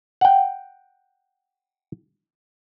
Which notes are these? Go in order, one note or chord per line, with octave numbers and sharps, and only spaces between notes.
F#5 G5